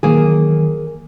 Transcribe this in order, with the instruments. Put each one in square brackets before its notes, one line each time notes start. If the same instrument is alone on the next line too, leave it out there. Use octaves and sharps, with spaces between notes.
[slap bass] D#3 E3 F#3 [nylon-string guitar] A#3 G#4